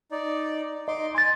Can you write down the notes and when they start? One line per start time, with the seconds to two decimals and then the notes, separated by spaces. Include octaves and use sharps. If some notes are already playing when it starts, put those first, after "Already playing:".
0.11 D#4 D5
0.88 D#4 D#5 C6 D6
1.15 G#5 C6 A6